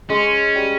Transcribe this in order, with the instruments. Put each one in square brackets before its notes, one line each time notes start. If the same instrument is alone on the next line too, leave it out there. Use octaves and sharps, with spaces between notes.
[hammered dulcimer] G#3 [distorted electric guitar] C#4
[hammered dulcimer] G3